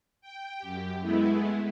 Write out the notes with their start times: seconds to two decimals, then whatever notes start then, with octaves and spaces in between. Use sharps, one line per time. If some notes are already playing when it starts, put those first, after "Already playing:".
0.21 G5
0.59 F#2 G4
1.01 G#3 A3 B3 E4